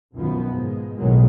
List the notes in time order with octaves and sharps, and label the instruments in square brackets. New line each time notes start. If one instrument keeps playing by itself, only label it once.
[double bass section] B1 F#2 D#3 F3 B3
G#2 G#3
B1 A2 D#3 F#3 G#3